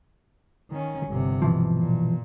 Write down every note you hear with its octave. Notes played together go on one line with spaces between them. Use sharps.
D#3 C#4
G1 C3
B2 E3 F3
A#2